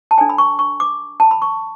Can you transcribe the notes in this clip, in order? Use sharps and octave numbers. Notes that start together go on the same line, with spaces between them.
A5
D4 A4 C#5 G#5
B5
C#6
C#6
D6
A5
B5
C#6